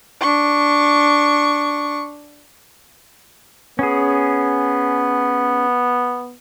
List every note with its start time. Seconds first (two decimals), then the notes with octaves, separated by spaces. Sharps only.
0.21 D4 C#6
3.79 B3 C#4 G#4